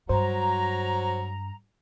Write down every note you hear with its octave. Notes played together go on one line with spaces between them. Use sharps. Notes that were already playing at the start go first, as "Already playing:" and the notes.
G2 F#3 C5 A#5